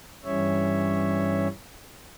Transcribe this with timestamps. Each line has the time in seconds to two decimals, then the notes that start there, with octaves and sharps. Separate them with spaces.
0.24 G2 E3 G3 C#4 C#5 E5